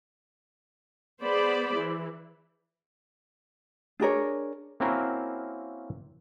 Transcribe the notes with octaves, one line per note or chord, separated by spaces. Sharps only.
B3 G#4 C5 D5 B5
E3
D4 G#4 A#4 C#5
A#3 C4 C#4 E4 F#4 A#4